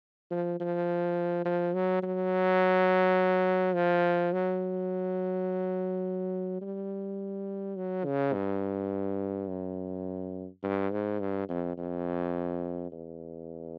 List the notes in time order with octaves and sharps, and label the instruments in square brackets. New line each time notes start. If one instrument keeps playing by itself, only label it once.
[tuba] F3
F3
F3
F#3
F#3
F3
F#3
G3
F#3
C#3
G2
F#2
G2
G#2
G2
F2
F2
E2